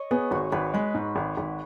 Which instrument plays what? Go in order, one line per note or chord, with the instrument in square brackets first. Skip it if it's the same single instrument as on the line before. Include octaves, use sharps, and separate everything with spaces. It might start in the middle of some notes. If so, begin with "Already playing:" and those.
Already playing: [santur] C#5 D#5
[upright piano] B3 [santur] G#4
[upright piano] G#1 [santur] F#4
[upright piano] G#1 [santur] B4
[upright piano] G#3 [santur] B4
[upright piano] G#2
G#1
G#1